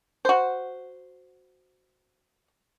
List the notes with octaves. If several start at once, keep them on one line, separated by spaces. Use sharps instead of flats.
F#4 C5